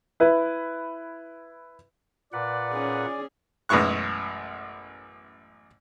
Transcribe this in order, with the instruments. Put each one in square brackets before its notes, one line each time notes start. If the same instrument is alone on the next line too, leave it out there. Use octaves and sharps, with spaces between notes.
[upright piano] E4 B4
[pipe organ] A#2 B4 F#5 [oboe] D5
[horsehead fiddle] C#4 G#4
[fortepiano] A1 F#2 B2 G#3 C#6 F#6